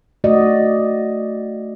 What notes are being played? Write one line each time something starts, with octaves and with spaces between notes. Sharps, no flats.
A3 F#4 D5 D#5